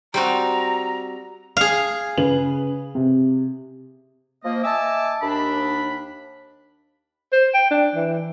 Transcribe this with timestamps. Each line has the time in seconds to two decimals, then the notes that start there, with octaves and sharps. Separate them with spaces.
0.14 G3 C4 F#4 A#5
1.57 G#4 F5
2.18 C#3 B4 F#7
2.95 C3
4.44 F3 A#3 D#5
4.64 D#5 E5 G#5 A5 D6 E6
5.22 D#2 D4 B5
7.32 C5
7.54 G5
7.71 D4
7.95 E3